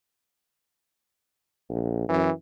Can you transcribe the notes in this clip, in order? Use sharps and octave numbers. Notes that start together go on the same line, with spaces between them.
A#1
F#2 E3